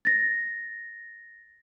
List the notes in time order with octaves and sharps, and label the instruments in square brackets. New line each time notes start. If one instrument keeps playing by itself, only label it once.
[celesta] A6 A#6